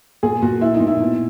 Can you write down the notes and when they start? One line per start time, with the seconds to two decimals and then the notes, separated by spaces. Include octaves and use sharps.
0.23 A#2 G#4
0.42 A#2 F#4
0.61 A#2 E4
0.74 D#4
0.80 A#2
0.87 E4
1.00 B2